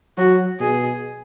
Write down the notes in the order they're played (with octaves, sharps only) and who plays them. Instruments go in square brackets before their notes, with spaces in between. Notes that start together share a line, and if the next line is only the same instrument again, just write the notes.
[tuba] F#3 [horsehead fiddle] F#4
[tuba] B2 [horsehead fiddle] G#4